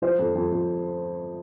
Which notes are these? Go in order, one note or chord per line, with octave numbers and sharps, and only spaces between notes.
F3 C5
F2
F2
F2